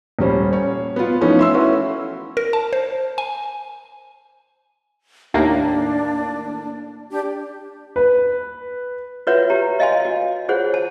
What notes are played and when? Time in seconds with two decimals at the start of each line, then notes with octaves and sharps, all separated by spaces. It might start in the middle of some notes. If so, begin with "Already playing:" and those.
0.19 D#1 G3 C#4 C5
0.53 C#5
0.96 B3 F4
1.21 E3 F3 A3 B3 C#4 D#4
1.39 E5 C6 E6
1.54 A3 C#4 E4 F#4 B4
2.37 A#4
2.53 A5
2.73 C5
3.18 G#5
5.34 D#2 A2 A#3 D4
7.10 D4 G4
7.96 B4
9.27 F4 F#4 B4 C#5 E5 F#5
9.50 G4 A#5
9.79 C#5 D#5 F5 G#5 A5 C6
10.05 F#4
10.49 F4 G#4 C5 C#5 F#5
10.74 A5